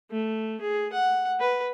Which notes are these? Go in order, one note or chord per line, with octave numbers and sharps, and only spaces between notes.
A3
G#4
F#5
B4